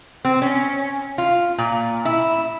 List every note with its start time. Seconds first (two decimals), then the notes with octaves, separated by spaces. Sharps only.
0.25 C4
0.42 C#4
1.18 F4
1.58 A#2
2.05 E4